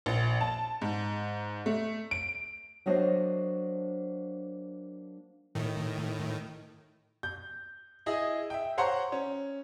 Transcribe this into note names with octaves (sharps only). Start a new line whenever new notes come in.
A#1
A5
G#2
A3
D7
F#3 A#3 D4 F#4 C5 D#5
A2 D#3
G6
E4 G#4 D#5
E5 G5
C5 C#5 F#5 A#5 C6 C#6
C#4